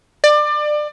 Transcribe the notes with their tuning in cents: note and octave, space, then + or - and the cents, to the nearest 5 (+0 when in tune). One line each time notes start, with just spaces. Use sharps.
D5 +25